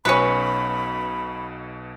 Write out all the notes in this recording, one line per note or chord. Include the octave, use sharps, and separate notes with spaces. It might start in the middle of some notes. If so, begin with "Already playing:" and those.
B1 B2 C#4 B4 B5 C#7